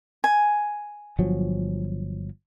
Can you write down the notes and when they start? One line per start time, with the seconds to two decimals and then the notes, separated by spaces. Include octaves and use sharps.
0.24 G#5
1.19 G1 F3 F#3